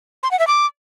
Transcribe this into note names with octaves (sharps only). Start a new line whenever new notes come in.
C6
F#5
E5
D6